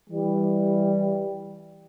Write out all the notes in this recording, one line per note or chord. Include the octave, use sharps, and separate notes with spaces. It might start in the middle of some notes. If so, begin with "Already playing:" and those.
E3 G3